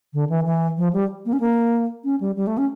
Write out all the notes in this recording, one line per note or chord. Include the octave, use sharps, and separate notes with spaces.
D3
E3
E3
F3
G3
A#3
C#4
A#3
C#4
G3
G3
A3
C#4